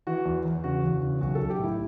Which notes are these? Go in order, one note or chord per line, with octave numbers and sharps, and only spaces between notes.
E3 F#4
E2
E2
C#3 F#4
E2
C#3
B1 F#4
B1 A4
G4
A2 E4